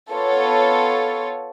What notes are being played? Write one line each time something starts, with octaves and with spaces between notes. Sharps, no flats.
B3 F4 A4 C#5